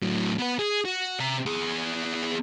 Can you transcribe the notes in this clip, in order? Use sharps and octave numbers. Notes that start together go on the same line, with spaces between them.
A2 F#3
B3 B4
G#4
F#4
C3 A#5
B3 G#4